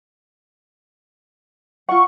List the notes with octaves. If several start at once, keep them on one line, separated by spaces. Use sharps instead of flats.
F4 F#5 C#6